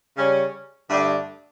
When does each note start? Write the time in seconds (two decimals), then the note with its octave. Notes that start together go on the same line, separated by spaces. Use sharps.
0.17 C#3 G3 C#4
0.90 G2 D3 A3 D4